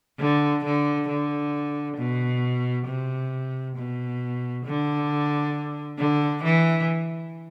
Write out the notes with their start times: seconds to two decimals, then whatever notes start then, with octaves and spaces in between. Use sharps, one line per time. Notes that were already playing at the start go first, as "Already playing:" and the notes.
0.19 D3
0.64 D3
1.08 D3
1.97 B2
2.87 C3
3.76 B2
4.65 D3
5.98 D3
6.43 E3